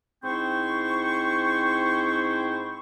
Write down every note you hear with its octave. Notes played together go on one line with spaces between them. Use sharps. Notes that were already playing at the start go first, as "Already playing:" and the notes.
G#2 C4 E4 C5 G5 C#6